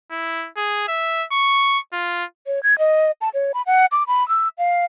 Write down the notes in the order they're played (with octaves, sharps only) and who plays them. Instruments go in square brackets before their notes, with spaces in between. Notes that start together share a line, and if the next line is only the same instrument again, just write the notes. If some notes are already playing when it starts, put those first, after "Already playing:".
[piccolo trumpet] E4
G#4
E5
C#6
F4
[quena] C#5
G#6
D#5
A5
C#5
B5
F#5
D6
B5
E6
F5